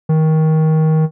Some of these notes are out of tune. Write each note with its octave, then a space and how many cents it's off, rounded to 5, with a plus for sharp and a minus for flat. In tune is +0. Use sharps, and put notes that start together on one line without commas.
D#3 +20